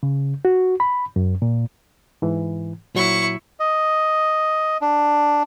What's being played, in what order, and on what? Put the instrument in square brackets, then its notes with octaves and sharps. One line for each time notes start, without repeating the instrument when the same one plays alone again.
[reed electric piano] C#3
F#4
B5
F#2
A#2
G#2 E3
[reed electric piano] A#2 F#3 [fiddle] E4 C#6
[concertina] D#5
D4